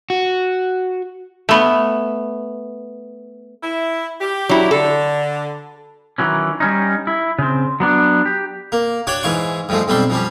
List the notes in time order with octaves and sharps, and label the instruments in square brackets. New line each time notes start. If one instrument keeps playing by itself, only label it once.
[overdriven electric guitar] F#4
[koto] A3 B3
[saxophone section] E4
G4
[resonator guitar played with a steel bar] F#3 E4
[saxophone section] D3 [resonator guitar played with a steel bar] A4
[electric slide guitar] D#3 E3 F#3 C#4
G3 C#4 D#4
E4
C#3 C4
F#3 B3 D4
G4
[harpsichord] A#3
D4 F#4 C#5 D5 G5
G#2 E3 F5 G#5 C#6
G2 F3 G#3 A3
B1 G3 C4 D4 C6
F3 G3 C#4